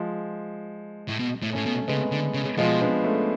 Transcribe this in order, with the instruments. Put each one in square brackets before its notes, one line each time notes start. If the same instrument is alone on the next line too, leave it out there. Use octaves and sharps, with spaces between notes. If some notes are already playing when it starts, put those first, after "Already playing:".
Already playing: [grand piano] F3 G#3
[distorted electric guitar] A2
B2
A2
[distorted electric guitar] A2 [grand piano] A3 C#4
[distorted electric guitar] B2
[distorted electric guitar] C#3 [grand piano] G#3 B3
[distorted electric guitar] D3
C#3
[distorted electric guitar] B2 [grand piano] F3 G#3
[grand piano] B3 D4
A3 C#4